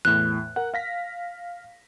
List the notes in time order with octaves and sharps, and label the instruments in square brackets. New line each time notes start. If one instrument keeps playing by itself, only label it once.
[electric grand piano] E2 A2 [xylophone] F#6
[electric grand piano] A#4 F#5
F5 A#6 B6